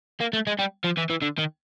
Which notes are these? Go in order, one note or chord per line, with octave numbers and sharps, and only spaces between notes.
A#3
A3
G#3
G3
F3
E3
E3
D3
D#3